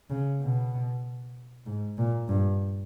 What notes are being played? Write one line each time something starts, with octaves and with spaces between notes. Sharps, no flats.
C#3
B2
G#2
A#2
G2